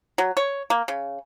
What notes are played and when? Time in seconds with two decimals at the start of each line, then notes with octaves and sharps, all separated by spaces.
0.18 F#3
0.37 C#5
0.70 A#3
0.88 C#3